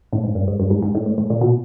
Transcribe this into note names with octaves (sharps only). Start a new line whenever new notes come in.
A2
G#2
G2
G#2
G2
G#2
G#2
A2
A2
A2
A#2
B2